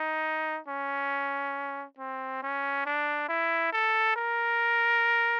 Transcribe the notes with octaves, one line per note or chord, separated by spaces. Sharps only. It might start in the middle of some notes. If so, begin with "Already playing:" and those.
Already playing: D#4
C#4
C4
C#4
D4
E4
A4
A#4